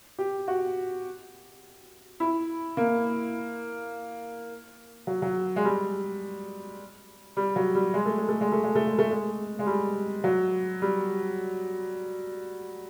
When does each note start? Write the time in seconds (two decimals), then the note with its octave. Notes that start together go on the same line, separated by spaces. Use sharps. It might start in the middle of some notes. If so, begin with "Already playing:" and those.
0.18 G4
0.48 F#4
2.20 E4
2.77 A#3
5.07 F#3
5.22 F#3
5.56 G#3
5.65 G3
7.37 G3
7.56 F#3
7.75 G3
7.94 G#3
8.06 A3
8.18 G#3
8.29 A3
8.41 G#3
8.52 A3
8.64 G#3
8.75 A3
8.87 G#3
8.99 A3
9.10 G#3
9.59 G#3
9.66 G3
10.24 F#3
10.82 G3